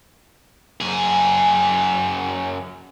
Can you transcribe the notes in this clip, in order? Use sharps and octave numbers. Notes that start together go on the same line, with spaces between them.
F#2 G#4